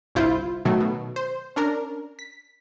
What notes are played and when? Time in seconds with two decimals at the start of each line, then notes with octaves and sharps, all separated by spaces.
0.15 G1 C2 E4 F4 C5 G6
0.65 B2 D#3 F#3 A3
0.80 B2
1.16 C5
1.56 C#4 D4 A#4
2.19 B6